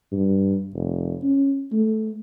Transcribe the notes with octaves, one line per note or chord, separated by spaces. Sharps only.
G2
F1
C#4
A3